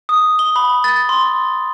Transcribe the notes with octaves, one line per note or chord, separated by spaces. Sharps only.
D#6
G7
B5
A6
C6